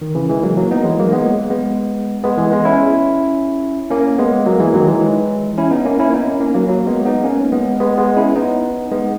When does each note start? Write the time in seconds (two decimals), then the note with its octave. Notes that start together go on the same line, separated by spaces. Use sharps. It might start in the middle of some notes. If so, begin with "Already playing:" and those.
0.02 D#3
0.15 C#3 E3
0.29 E3 G#3
0.43 F#3 A#3
0.57 F#3 A#3
0.71 B3 D#4
0.84 E3 G#3
0.99 F#3 A#3
1.12 G#3 B3
1.50 G#3 B3
2.24 G#3 B3
2.38 E3 G#3
2.51 G#3 B3
2.65 C#4 E4
3.90 A#3 C#4
4.19 G#3 B3
4.46 F#3 A#3
4.60 E3 G#3
4.74 D#3 F#3
4.87 E3 G#3
5.58 C#4 E4
5.71 B3 D#4
5.85 A#3 C#4
6.00 C#4 E4
6.13 B3 D#4
6.27 A#3 C#4
6.40 A#3 C#4
6.55 F#3 A#3
6.68 F#3 A#3
6.87 G#3 B3
7.05 B3 D#4
7.24 A#3 C#4
7.52 G#3 B3
7.80 G#3 B3
7.98 G#3 B3
8.17 C#4 E4
8.35 B3 D#4
8.92 G#3 B3